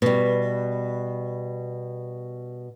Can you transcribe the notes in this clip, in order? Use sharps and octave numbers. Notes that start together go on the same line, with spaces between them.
B2 G3